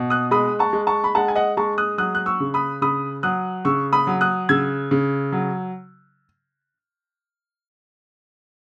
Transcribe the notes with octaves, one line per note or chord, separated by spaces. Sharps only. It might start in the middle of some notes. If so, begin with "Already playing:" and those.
Already playing: B2
D#6 F#6
G#3 B5 D#6
A5 C#6
G#3
A5 C#6
B5
G#3 F#5 A5
G#5
D#5 F#5
G#3 A5 C#6
D#6 F#6
F#3 D#6 F#6
F#6
C#6 E6
C#3
B5 D#6
C#3 B5 D#6
F#3 D#6 F#6
C#3 C#6 E6
B5 D#6
F#3
D#6 F#6
C#3 E6 G#6
C#3
F#3